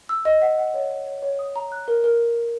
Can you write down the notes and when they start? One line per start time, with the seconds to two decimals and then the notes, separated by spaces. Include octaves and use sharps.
0.09 E6
0.25 D#5
0.42 F#5
0.58 F#5
0.74 C#5
0.90 C#5
1.06 C#5
1.23 C#5
1.39 D#6
1.56 A#5
1.72 F#6
1.88 A#4
2.04 A#4